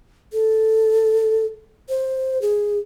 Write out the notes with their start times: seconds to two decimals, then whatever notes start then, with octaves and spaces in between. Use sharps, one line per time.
0.33 A4
1.89 C5
2.42 G#4